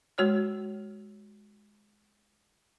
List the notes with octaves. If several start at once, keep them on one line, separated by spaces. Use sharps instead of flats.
G#3 F#4 C#5 F6